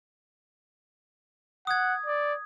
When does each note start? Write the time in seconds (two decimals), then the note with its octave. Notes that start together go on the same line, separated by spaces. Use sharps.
1.67 F#5 D#6 G#6
2.06 D5